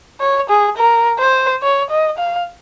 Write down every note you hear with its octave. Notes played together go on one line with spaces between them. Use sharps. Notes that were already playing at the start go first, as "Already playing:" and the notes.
C#5
G#4
A#4
C5
C#5
D#5
F5